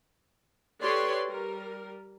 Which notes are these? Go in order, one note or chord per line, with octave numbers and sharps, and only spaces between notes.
G4 A4 B4 C#5 D5 C6
G3 A#4